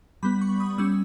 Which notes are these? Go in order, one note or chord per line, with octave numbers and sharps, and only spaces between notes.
G3 B3 B5
C#6
D#6
G3 C#4 E6